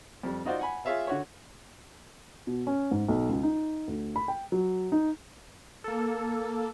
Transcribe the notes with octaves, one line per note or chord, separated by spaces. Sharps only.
F2 G3
D#4 F4 F#4 C5 D5
F#5 G#5 B5
F4 G#4 C#5 E5 F5
D3 F#4 C#5
B2
C#4
G#2
B1
C#2
D#4
D2
B5
G5
F#3
D#4
A#3 A4